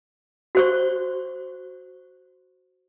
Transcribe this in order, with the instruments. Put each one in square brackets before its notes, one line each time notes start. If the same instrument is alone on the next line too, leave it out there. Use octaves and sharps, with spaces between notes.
[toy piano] F#4 C5 C#6